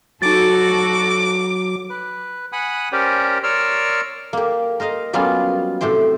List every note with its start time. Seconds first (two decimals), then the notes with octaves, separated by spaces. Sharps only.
0.22 F#3 D#4 F#4 A4 D6 A6
1.90 B4
2.52 F#5 G#5 B5 D#6
2.92 C#4 G4 A#4 C5 D5
3.43 A#4 C#5 D5 C6 E6 F6
4.33 A#3 G4
4.80 A#4 C5 D#5 F5
5.13 F#3 G3 A#3 B3 C#4 F4
5.81 A2 C3 G4 C5 G5